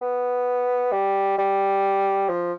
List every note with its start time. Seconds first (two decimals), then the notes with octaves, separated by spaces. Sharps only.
0.01 B3
0.92 G3
1.38 G3
2.29 F3